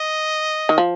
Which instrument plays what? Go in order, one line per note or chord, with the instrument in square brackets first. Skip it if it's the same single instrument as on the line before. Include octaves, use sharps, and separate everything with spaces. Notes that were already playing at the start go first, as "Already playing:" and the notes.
Already playing: [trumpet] D#5
[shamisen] D#3
F3